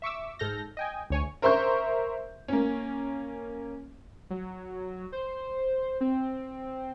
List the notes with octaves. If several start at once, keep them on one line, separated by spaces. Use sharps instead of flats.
E5 C#6 D6 E6
G#2 A4 F6 G6 A#6
D#5 G5 G#5
D2 C#5 G#5
A#4 C5 E5 C6 C#6 G6
A#3 C#4
F#3
C5
C4